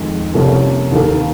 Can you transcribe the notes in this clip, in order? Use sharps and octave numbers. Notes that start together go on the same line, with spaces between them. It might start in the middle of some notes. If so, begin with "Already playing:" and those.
Already playing: F2 D#3 G#3
C2 C3 F3 A#3 C#4
D#2 D#3 A#3